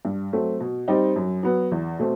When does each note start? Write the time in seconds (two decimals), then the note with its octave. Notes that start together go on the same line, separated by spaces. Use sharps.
0.05 G2
0.33 F#3 A3 C4
0.60 B2
0.88 G3 C4 D#4
1.16 F#2
1.43 F#3 B3
1.71 E2
1.99 B2 A3 C4